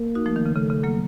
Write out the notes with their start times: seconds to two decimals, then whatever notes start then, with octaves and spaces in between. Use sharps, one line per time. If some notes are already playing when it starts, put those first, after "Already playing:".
Already playing: A#3
0.15 D#4 F#4
0.26 F3 A3
0.36 D#3
0.46 C#3
0.56 C#3 A3
0.70 C#3
0.83 F#3 A#3